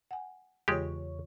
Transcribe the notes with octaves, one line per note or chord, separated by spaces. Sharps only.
F#5 G#5
E2 C#3 E3 G#3 F4 G4 C#5